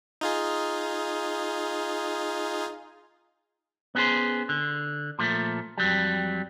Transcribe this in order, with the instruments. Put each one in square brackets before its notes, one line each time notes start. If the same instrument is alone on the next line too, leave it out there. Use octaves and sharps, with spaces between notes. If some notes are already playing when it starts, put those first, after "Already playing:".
[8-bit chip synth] D#4 F4 G#4
[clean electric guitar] B3 C#4 F#4 G#4 C5
D3
A#2 F3 A3
F2 F#3 G3